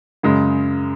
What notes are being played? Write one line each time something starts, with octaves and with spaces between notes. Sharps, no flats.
F#2 C#3 G#3